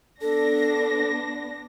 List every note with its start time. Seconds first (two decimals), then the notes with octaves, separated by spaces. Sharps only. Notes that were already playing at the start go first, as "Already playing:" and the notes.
0.22 B3 D4 A4 A#6